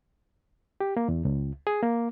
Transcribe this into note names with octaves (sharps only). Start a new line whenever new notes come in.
G4
A#3
E2
C#2
G#4
A#3